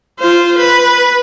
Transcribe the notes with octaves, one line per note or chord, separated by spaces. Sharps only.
F4 C5
B4